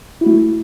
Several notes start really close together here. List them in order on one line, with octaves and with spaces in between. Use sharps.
E4 F#4 A3